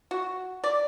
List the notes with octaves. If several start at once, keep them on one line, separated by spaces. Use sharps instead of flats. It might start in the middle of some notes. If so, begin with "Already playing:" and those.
F#4
D5